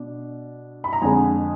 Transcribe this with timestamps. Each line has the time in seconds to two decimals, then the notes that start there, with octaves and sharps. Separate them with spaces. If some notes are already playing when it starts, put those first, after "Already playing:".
Already playing: B2 D4
0.84 B5
0.93 A#5
1.02 F2 D3 G#3 G#5